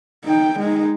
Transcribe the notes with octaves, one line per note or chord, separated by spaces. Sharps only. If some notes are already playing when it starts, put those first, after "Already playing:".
D#4 G5
G#3 D#4